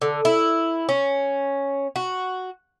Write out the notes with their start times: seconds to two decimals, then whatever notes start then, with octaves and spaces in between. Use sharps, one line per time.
0.02 D3
0.25 E4
0.89 C#4
1.96 F#4